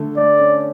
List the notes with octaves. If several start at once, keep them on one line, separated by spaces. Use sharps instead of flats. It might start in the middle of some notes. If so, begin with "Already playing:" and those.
Already playing: D3 A3
A3 D5
C#4